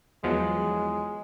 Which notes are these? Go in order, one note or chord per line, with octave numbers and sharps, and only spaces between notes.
E2 F3 F#3 G#3